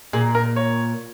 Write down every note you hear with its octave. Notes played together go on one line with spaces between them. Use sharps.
A#2 G#4
A#4
C#5